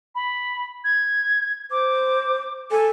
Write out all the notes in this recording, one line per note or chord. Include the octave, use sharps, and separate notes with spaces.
B5
G#6
C5 D6
A4 G#5